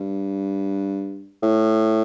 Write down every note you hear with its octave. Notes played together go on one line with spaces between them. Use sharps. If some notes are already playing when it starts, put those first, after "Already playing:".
Already playing: G2
A2